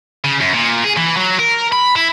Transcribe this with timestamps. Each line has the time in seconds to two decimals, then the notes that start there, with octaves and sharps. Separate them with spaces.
0.24 C#3
0.41 F#2
0.54 A#2
0.84 G#4
0.97 E3
1.16 F#3
1.39 A#4
1.72 B5
1.96 E4